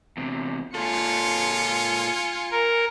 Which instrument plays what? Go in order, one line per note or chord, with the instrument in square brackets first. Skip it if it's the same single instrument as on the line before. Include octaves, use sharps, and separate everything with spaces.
[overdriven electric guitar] E2 C3
[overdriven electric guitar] A#2 A4 [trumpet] F4 [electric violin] G#5 C#7
[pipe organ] A#4